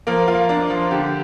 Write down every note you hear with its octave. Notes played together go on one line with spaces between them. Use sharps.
F3 A#3 A#4
F4
D4
F3
D3 G4